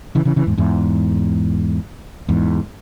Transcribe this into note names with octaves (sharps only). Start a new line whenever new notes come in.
C#3 E3
C#3 E3
C#3 E3
E2 G#2
E2 G#2
E2 G#2